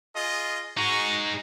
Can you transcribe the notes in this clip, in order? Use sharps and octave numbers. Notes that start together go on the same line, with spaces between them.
F4 G#4 D#5
D#4 F#4 G#4 A#5 C#6